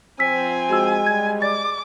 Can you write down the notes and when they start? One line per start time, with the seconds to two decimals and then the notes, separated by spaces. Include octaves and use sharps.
0.19 F3 C4 G#5 E6 B6
0.70 G#3 F#4 E6
1.07 G3 G4 G#6
1.42 D5 D6 A6